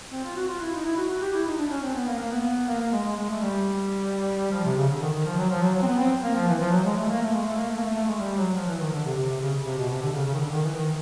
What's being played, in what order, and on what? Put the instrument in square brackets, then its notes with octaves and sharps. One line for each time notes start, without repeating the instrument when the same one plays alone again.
[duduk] C4
F4
F#4
F4
E4
D#4
E4
F#4
F#4
G4
E4
D#4
D4
C#4
C4
B3
A#3
A#3
B3
A#3
A#3
G#3
G#3
G#3
A3
G3
F3
C3
C#3
D3
D#3
D#3
F3
F#3
F3
F#3
F#3
C4
B3
C4
A#3
F3
E3
F3
F#3
G#3
A3
A#3
A3
G#3
A3
A#3
A3
A#3
A3
A3
G#3
G3
F#3
F3
E3
D#3
D3
C3
C3
C3
C#3
C3
B2
C3
D3
C#3
C#3
D#3
D3
D#3
E3
D#3